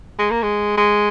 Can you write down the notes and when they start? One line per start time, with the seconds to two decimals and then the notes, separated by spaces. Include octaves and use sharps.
0.19 G#3
0.31 A#3
0.43 G#3
0.78 G#3